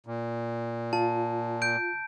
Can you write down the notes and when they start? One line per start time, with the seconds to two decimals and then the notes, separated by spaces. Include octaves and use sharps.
0.06 A#2
0.93 F4 A5
1.62 G6 D7